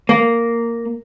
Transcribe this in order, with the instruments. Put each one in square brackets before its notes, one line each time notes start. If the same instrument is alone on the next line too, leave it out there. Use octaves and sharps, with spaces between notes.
[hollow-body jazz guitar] A#3